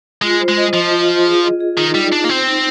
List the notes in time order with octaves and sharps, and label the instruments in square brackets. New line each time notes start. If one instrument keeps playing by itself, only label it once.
[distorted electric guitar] G#3 [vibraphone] F4
[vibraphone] C5
[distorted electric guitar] G#3
[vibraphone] D#5
[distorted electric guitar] F3 [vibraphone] D#5
[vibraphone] F4
F4
G#4
D#5
G#4
[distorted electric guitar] D#3 [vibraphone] D#4
[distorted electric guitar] G3 [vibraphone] D#4
[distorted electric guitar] D4 [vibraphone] D#4
[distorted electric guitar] A#3
[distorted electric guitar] C4 [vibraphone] C5
[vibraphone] D#4